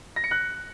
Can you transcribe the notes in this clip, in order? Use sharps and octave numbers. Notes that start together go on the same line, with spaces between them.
A#6
C#7
F#6